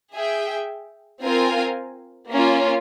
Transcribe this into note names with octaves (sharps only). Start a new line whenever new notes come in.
G#4 E5 G5
C4 F4 A#4 F5 G#5
A#3 C#4 F4